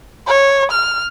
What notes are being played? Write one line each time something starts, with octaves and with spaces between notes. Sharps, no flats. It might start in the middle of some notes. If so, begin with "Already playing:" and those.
C#5
F6